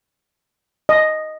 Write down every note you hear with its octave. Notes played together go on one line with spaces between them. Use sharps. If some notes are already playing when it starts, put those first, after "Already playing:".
D#5